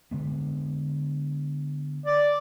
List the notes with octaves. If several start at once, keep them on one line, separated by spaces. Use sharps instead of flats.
D3 G#3 B3
D5